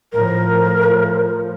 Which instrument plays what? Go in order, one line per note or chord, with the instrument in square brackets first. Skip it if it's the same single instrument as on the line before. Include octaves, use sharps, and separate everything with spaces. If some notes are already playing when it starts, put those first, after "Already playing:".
[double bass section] A2 F3 [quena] A#4